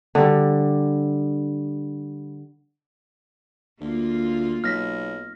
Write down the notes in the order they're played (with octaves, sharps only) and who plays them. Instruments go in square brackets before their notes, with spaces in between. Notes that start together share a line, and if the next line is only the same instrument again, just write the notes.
[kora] D3 G3
[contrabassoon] D2 [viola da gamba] A#3 F4
[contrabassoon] B1 [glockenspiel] F6 A#6 B6